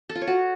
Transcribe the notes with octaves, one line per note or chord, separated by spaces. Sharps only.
A4
F4
C#5
F#4